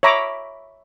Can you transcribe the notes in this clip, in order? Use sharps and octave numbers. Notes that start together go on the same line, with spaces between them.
C#5 E5 A#5 B5 D6